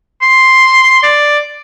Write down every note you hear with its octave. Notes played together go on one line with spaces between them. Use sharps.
C6
D5